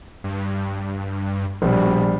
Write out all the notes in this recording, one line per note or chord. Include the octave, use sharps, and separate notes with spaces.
G2
A#1 B2 G3